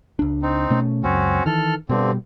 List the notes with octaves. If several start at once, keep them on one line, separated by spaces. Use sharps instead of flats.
C#2 D4
C4 D#4
B2 A3 C#4
C#2 F#2 C4 C#4 F#4
D#3 E3 A4 F6
G2 B2 D3 G3 C4